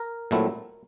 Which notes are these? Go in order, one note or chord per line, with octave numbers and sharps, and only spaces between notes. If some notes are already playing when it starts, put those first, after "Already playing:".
Already playing: A#4
A#2 F#3 A3 C4 E4